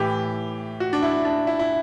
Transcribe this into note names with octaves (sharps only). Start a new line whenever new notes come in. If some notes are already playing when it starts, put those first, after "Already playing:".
Already playing: A2 E3 G4
F#4
D4
E4
D4
E4
E4